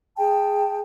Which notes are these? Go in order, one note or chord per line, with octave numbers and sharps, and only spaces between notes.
G#4 G5 A5